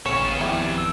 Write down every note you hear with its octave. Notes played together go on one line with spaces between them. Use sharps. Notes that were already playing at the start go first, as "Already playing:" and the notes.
A1 G2 A#2 C#3 C#4 C#5 C#7 E7
G#1 B3 F4 G#4
F2 G3 E4
E6